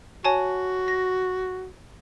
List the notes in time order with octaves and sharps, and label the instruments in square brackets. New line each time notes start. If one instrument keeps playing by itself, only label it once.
[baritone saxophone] F#4 [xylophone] C#5 G#5 A5
[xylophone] A#6